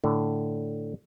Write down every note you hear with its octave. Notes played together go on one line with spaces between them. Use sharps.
A2 D3